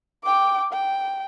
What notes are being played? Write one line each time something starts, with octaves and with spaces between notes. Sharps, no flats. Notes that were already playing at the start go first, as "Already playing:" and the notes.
G5 D6
G5